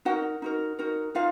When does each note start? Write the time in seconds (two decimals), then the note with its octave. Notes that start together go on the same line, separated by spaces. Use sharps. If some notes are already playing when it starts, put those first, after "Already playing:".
0.05 D#4 F#4 A#4 F#5
0.42 D#4 F#4 A#4
0.79 D#4 F#4 A#4
1.15 D#4 F4 F5